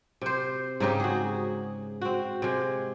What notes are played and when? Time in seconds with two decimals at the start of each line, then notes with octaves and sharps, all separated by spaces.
0.22 C3 C5
0.80 G#2 C#3 D#4 G4
1.00 F#4 G#4
2.01 C4 F#4
2.42 C3 G#3